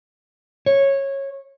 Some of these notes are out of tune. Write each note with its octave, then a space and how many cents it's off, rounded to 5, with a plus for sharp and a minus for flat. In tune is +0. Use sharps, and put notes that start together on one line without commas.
C#5 -15